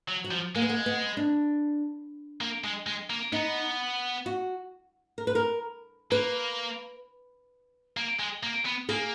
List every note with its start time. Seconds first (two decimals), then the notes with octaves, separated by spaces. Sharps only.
0.09 F#3
0.24 F#3
0.31 F3
0.55 G#3 A#3
0.62 B3
0.70 A#3
0.86 B3
1.17 D4
2.41 A#3
2.64 G#3
2.87 G#3
3.10 A#3
3.32 B3 D#4
4.26 F#4
5.18 A#4
5.27 B4
5.35 A#4
6.11 A#3 B4
7.97 A#3
8.19 G#3
8.43 A#3
8.66 B3
8.89 A#3 G#4